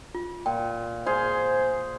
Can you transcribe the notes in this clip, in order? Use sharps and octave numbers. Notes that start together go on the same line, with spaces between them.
F4
A#2 G5
G#4 C5 F5 C6